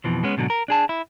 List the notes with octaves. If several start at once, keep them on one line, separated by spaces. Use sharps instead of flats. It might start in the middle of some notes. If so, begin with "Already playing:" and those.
F2 B2 E3 F3
G#3 B3 C#4
G#2 B2 D3 F#3
A#4
D4 G#4 A5
E4